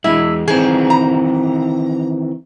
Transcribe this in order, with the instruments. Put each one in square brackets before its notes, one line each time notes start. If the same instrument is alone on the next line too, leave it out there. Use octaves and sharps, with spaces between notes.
[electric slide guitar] E2 G#3 [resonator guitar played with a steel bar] E4
[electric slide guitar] D#3 E3 C4 [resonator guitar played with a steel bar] G#4
[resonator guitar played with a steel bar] A#5